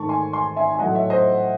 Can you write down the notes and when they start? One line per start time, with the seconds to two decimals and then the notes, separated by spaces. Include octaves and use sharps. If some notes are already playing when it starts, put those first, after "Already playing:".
Already playing: G#2 D#3 A3 A5 C#6
0.09 G#5 C6
0.33 G#5 C6
0.56 E5 G#5
0.72 G#5
0.79 A2 F#3 A3 D#5 F#5
0.95 C#5 E5
1.10 C5 D#5